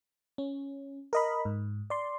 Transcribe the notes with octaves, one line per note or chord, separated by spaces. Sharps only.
C#4
A#4 D#5 B5
G#2
D5 C6